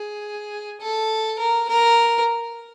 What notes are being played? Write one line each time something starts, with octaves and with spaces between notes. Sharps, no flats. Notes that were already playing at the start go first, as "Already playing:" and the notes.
Already playing: G#4
A4
A#4
A#4